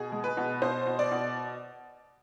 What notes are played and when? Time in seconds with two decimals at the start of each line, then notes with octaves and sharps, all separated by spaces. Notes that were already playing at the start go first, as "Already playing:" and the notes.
Already playing: B2 G#4
0.12 G#3
0.24 B4
0.37 B2
0.62 B2 C5
0.86 B2
0.99 D5
1.11 B2